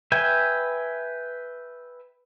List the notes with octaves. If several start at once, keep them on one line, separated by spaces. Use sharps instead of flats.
B4 E5 G5 G#5